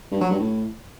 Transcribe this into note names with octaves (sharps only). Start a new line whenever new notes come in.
G2
F#3
G2
A2